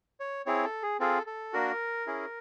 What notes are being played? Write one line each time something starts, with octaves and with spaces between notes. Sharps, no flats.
C#5
C4 E4 G#4 C#5
A4
G#4
C4 F4 G#4 A4
A4
A#3 D4 F#4 A#4
C#4 E4 G#4